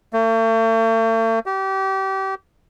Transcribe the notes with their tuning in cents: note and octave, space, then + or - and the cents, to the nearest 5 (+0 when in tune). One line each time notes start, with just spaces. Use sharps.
A3 +45
G4 -30